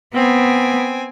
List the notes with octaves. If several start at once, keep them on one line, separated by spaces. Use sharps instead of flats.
B3 C4 G#5